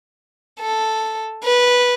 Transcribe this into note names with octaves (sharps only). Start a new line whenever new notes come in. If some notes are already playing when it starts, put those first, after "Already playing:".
A4
B4